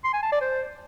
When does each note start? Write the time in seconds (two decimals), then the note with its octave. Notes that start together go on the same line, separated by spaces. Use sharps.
0.04 C6
0.13 G#5
0.23 A5
0.32 D5
0.41 C5